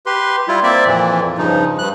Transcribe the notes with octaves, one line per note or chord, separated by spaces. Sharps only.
G4 B4 C6
G3 E4 F4
A#3 C4 D5 E5
F2 A#2 E3
G2 C#3 F3 D#4
G2 F#6